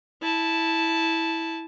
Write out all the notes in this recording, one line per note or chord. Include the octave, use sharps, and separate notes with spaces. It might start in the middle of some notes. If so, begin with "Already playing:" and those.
E4 A5